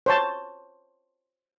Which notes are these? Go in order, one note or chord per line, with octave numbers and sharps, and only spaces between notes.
C5 C#5 A5